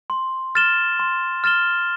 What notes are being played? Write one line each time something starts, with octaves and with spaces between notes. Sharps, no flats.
C6
F6 A6 E7 G7
C6
F6 A6 E7 G7